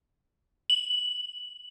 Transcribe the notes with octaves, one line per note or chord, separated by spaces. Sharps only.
F#7